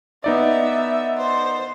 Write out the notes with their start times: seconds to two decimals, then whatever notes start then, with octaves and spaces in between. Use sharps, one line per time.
0.24 B3 D#4 D5 E5
1.18 C5